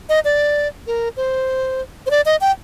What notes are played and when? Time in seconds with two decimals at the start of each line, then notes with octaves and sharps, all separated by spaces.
0.09 D#5
0.25 D5
0.87 A#4
1.17 C5
2.06 C5
2.11 D5
2.26 D#5
2.41 G5